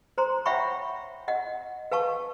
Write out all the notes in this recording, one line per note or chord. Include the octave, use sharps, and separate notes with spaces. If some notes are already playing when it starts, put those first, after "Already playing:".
C5 A#5 C6
C#5 E5 F#5 G5 B5 C#6
D#5 F#5
B4 F5 A5 C#6